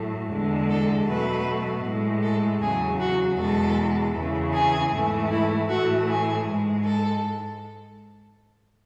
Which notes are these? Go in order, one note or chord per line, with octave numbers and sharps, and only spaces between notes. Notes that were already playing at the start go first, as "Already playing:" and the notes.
Already playing: A2 F#3 A3
E2 D3 G#3
A4
B2 F#3 A3 B4
A2 G#3
A4
E2 C#3 F#3 G#4
F#4
E2 B2 G#3 A4
E2 C#3 E3
G#4
G#2 E3 A3
E4
A2 E3 A3 F#4
G#4
G#2 G#3
A4